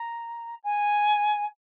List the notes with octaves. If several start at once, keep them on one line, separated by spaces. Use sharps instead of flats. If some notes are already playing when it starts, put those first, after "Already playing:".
Already playing: A#5
G#5